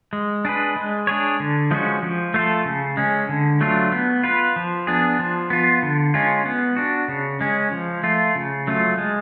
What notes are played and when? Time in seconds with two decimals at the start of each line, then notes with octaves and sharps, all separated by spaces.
0.13 G#3
0.45 D4 G#4 B4
0.76 G#3
1.07 D4 G#4 C#5
1.40 D3
1.71 F3 G#3 C#4 F#4
2.03 F3
2.34 A3 F4 A4
2.65 C#3
2.97 G#3 C#4
3.29 D3
3.61 F#3 A3 D4 F4
3.92 B3
4.24 F4 B4
4.56 F3
4.87 B3 D4 G#4
5.19 F3
5.50 B3 F4
5.83 D3
6.14 G#3 C#4 F4
6.46 B3
6.77 D4 F#4
7.08 C#3
7.41 G#3 C#4
7.72 F3
8.03 A3 F4
8.35 C#3
8.67 F#3 A3 F4
8.98 G#3